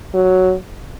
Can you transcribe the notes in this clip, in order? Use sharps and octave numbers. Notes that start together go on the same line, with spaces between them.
F#3